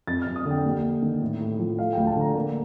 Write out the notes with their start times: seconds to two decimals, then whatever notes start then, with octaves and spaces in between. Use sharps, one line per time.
0.07 F2 A6
0.22 F2 F6
0.36 D#6
0.45 D3
0.51 G5
0.64 D#2
0.83 D#2
1.02 D#3
1.21 A2
1.40 A2
1.59 F3
1.78 A3 F5
1.93 D2 G5
2.07 A5
2.16 D3 A#5
2.35 A#3